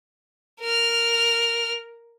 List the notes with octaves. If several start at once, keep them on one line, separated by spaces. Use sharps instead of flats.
A#4 F6